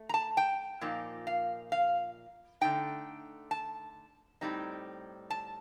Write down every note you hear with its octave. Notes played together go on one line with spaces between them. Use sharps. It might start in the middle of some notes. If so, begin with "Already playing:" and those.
Already playing: A3
A#5
A5
G5
A#2 F3 A#3 D#4
F5
F5
D3 A3 D#4 G5
A5
A2 G3 C4 D#4
A5